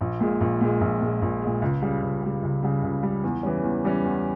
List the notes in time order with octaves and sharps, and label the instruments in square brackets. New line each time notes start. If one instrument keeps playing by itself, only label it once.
[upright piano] A#1
A#2 G#3
A#1
A#2 G#3
A#1
A#2 G#3
A#1
A#2 G#3
C#2
C#3 G3
C#2
C#3 G3
C#2
C#3 G3
C#2
C#3 G3
E2
E3 G3 C#4
E2
E3 G3 C#4
E2